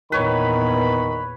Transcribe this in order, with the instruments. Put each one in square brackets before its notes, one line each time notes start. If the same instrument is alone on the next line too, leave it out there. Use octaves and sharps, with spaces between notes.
[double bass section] E2 A#2 B3 [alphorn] D#3 [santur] B4 C#5 [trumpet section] B5